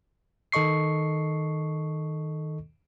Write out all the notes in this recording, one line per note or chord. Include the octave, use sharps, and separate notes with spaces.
D#3 A4 D#5 C#6 C7